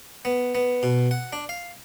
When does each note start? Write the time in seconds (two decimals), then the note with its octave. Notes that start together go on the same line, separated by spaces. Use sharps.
0.25 B3
0.55 B3
0.83 B2
1.11 F#5
1.33 D4
1.49 F5